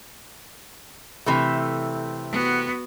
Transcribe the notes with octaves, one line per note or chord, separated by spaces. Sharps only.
C3 E3 A3
B3 F#4